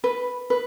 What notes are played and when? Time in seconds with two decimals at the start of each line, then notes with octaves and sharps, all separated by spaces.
0.04 B4
0.50 B4